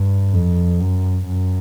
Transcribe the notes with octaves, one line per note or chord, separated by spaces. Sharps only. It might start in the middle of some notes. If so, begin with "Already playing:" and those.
Already playing: G2
F2
F#2
F#2